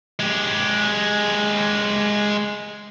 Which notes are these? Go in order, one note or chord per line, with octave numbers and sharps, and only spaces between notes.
G#3 G4